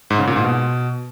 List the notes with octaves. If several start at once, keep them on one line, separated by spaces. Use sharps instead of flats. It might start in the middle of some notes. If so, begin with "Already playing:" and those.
G#2
C#3
A#2
G#2
B2